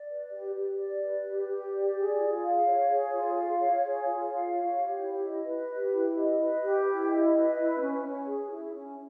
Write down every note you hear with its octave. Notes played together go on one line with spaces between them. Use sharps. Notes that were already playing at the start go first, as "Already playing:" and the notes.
Already playing: D5
B4
G4
G4
D5
B4
G4
G4
D5
G#4
F4
F5
C#5
G#4
F4
F5
C#5
G#4
F4
F5
C#5
G4
E4
D#5
B4
G4
E4
D#5
B4
G4
E4
D#5
B4
E4
C#4
C#4
G#4
E4
C#4